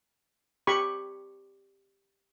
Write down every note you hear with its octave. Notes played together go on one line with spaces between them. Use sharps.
G4 B5 C#6